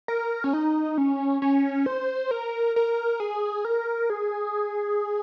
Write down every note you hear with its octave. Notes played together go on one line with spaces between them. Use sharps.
A#4
C#4
D#4
C#4
C#4
C5
A#4
A#4
G#4
A#4
G#4